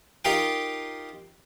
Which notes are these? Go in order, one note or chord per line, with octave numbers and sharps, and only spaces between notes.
D#4 F4 G4 A#4 F5 G5